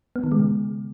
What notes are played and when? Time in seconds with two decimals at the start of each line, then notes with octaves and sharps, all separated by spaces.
0.16 B3
0.24 D#3
0.32 G#3
0.40 C#3